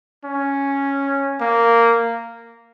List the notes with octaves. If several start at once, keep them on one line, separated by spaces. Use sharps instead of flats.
C#4
A#3